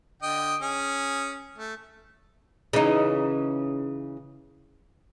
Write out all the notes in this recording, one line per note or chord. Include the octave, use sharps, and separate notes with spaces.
D3 D#5 G5
C#4 G#4
A3
C#3 E3 D#4